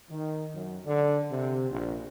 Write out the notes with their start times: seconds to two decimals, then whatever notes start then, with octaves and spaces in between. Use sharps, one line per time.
0.10 D#3
0.55 F#2
0.85 D3
1.31 C3
1.71 A#1